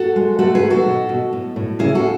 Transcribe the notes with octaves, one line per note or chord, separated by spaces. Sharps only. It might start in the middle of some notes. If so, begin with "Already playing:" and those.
Already playing: F#4 A4
G#3
A3 F#4 A4
G#4 B4
D#3
F#4 A4
B2
B2
A2
A2
C#3 E4 G#4
F#4 A4